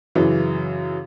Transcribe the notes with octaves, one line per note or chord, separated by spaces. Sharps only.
F#2 C#3 E3